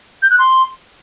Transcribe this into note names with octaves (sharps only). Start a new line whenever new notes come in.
G6
F#6
C6